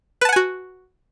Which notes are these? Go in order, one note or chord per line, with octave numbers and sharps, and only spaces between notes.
F#4 B4 F#5 G#5 A5